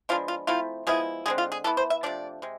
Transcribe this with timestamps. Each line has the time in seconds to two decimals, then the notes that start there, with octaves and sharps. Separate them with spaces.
0.09 F3 G#3 B3 D4 F4
0.28 F4
0.47 F3 A3 C4 E4 F4
0.87 F3 G#3 B3 E4 G#4
1.26 D3 G#3 C4 G#4
1.38 F4
1.52 G#4
1.64 E3 B3 E4 A4
1.77 C5
1.90 E5
2.03 C3 F3 A3 D4 D5
2.42 C3 G#3